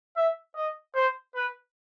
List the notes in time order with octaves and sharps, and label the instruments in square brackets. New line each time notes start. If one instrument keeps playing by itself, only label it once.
[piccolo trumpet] E5
D#5
C5
B4